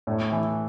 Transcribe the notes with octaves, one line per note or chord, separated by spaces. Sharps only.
A2
E3